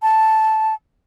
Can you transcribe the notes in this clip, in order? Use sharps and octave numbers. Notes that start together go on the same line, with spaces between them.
A5